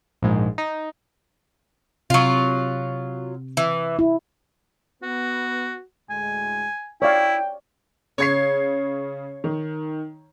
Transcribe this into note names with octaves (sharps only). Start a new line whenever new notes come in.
A#1 G#2
D#4
C3 F#3 F4
E3
E4
B3 F#4
D2 A2 G#3 G#5
E4 C#5 D5 F5 G5
C#3 C#5 G#6 C7
D#3